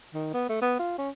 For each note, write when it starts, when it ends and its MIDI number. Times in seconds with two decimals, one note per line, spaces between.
0.15 0.33 51
0.34 0.48 59
0.49 0.58 57
0.62 0.76 59
0.79 0.94 65
0.98 1.10 61